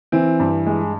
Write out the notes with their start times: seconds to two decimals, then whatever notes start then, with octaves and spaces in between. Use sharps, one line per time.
0.12 E3 C4
0.40 G2
0.66 G#3